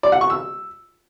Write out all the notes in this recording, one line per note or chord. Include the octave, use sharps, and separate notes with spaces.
D5
F#5
C#6
E6